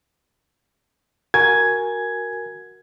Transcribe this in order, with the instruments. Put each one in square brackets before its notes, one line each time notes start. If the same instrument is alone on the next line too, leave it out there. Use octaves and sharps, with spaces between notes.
[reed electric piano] F#4 A#4 G#5 [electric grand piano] G#6